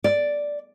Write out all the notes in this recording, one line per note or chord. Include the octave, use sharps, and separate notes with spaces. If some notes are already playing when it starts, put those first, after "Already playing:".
D5